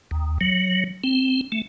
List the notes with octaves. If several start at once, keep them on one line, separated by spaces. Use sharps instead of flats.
D#2
F#3
C4
A3